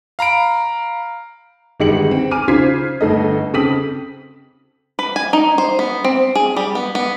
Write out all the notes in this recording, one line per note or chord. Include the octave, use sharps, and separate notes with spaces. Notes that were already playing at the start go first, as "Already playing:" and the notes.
F5 A#5 B5 D7
G1 D#3 G#3 G4 C#7 F#7
C4
G#5 D6 F6 D#7
C#3 F4 C5 G#6 B6 C7
G1 A3 A4 D#5
C#3 C4 A4 D#6 B6 F#7
B4
G#5
D#4
C5
B3
C4
G#4
G3
B3
B3